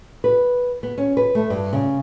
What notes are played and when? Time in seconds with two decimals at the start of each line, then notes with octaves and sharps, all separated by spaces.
0.24 B4
0.83 B3
0.98 C#4
1.17 B4
1.35 A3
1.50 G2
1.73 C#3